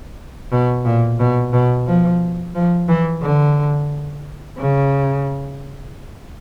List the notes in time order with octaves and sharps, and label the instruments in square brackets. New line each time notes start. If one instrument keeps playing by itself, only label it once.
[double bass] B2
A#2
B2
B2
F3
F3
E3
D3
C#3